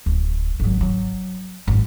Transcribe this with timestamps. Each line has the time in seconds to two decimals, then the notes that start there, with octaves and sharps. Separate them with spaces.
0.06 D1
0.60 G#1 F#3
0.81 F#3
1.68 G#1 F#2